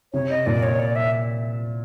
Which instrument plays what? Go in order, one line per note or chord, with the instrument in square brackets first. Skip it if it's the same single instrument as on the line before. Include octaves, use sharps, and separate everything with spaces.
[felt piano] C3 [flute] C#5
[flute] D#5
[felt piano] A#2 [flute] D5
[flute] C#5
D5
E5